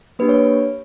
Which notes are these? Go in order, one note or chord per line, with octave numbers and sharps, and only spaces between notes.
A#3 D4 G4 B4
C#5